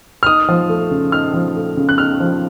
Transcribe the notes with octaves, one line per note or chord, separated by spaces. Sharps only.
F6
D#4 D#6
F3
A3
C#3
D#4 F6
F3
A3
C#3
F#6
D#4 F6
F3